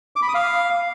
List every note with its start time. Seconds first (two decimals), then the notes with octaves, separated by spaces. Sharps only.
0.16 D6
0.22 B5
0.28 D#6
0.35 F5